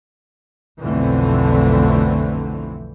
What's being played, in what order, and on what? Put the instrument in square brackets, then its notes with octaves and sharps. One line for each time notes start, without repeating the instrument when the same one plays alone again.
[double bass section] B1 F2 D3 E3 A3 C4